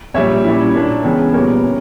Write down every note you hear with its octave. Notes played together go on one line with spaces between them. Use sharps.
A#1 A#2 G3 C#5 E5
A#2 G3 C#4 E4
A#2 A#3 D4
C#2 C#3 E3 B3
A#2 G3 B3 A#4 C#5
C#3